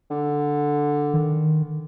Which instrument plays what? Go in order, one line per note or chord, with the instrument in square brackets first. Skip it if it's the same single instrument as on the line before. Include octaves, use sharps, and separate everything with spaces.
[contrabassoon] D3
[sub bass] D#3